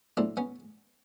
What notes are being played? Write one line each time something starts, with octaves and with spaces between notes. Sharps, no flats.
A2 F#3 C4 D4
B3 C#4